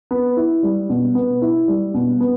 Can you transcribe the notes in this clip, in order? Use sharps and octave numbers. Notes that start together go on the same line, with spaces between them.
B3
E4
G3
B2
B3
E4
G3
B2
B3